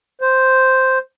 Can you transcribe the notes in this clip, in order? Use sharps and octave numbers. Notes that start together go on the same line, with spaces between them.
C5